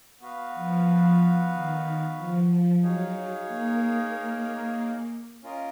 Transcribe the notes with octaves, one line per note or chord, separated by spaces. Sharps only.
B3 F#4 B4 F5
F3
D#3
F3
F3
F#3 D#4 G#4 C#5 F5
A#3
C#4 F4 A#4 D#5